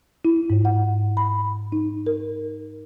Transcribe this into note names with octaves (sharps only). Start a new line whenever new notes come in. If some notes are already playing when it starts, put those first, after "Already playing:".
E4
G#2
F#5
B5
D#4
A#4